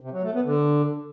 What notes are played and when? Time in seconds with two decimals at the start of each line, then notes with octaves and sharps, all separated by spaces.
0.01 C3
0.12 F#3
0.23 A3
0.34 B3
0.45 D3